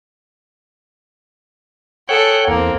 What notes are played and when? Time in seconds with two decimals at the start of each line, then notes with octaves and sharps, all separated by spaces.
2.09 G#4 A4 C#5 F#5 G5
2.48 E2 A#3 C4